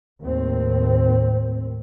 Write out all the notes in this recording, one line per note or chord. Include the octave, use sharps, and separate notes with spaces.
D#2 A2 C4